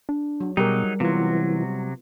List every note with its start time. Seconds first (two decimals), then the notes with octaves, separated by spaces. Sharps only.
0.09 D4
0.40 F#3
0.57 B2 F#3 G3 D#4 G4 G#4 A#4
1.00 C3 E3 F#3 B3 F4